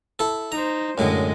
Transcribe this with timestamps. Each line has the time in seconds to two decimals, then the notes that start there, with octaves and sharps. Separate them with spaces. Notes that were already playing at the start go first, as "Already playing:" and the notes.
0.19 E4 A4
0.52 D#4 C5 A#5
0.98 F#2 A2 D3 G#3 D#5